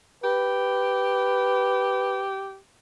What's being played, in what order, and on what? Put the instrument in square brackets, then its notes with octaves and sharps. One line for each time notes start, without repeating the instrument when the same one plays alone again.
[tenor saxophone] G4 [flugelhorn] B4